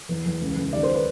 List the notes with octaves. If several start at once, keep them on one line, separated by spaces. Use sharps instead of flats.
E2
E2
C#2
C#2
D#2 D5
C5
B4